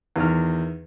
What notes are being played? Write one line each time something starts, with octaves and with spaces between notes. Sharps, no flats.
E2 D#3 F6